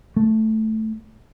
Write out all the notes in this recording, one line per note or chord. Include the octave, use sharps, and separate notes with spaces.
A3